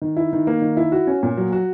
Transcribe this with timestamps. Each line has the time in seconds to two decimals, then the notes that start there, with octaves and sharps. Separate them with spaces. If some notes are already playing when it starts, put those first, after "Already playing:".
0.02 D#3
0.16 E4
0.33 D#3
0.47 A#3
0.62 D#3
0.77 E4
0.92 F#4
1.07 C#4
1.23 A#2
1.37 F#3
1.52 F#4